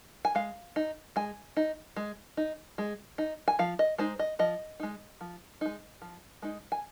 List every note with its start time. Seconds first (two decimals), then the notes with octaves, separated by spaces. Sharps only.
0.25 G#5
0.35 G#3 F5
0.76 D#4
1.16 G#3 G#5
1.57 D#4
1.96 G#3
2.37 D#4
2.78 G#3
3.18 D#4
3.48 G#5
3.59 F3 F5
3.79 D#5
3.98 G#3 D#4 C5
4.19 D#5
4.39 F3 D#5
4.80 G#3 D#4
5.21 F3
5.61 G#3 D#4
6.02 F3
6.42 G#3 D#4
6.72 G#5